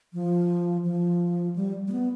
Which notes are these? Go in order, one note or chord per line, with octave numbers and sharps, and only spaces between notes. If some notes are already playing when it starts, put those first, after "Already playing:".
F3
F3
G3
G#3
B3